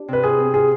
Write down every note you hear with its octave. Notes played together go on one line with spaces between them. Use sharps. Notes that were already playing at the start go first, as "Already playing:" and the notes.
Already playing: D4 G4
C3 B4
F4 G#4
C4
F4 G#4